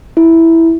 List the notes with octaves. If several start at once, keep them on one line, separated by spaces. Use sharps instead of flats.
E4